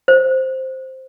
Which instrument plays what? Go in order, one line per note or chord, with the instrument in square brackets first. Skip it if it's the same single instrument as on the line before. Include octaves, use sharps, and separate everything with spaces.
[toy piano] C5